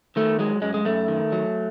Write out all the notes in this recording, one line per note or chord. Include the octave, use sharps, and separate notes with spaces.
D#3 A3
F#3 G#3
F#2 G#3
G#3
F#2 A3
D#3
F#3